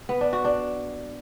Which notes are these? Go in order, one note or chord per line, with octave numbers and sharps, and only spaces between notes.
B3
D4
F#4
D4